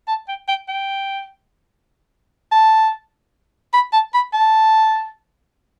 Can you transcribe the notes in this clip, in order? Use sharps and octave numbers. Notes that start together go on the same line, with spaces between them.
A5
G5
G5
G5
A5
B5
A5
B5
A5